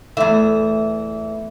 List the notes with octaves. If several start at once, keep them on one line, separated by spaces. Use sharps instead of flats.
E2 E3 A3 E5